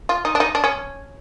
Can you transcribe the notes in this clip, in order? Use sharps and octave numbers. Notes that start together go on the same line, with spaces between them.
F4
D#4
D4
D#4
D4
C#4